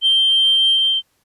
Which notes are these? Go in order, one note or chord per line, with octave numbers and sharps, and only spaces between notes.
G7